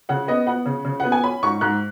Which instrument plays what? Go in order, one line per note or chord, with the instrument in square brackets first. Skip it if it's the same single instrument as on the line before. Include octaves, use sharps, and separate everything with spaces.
[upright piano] C#3 F#5
B3 D#5
B3 F#5
C#3
C#3
B3 F#5
G#5
C#4 B5
G#2 C#6
G#2 F#6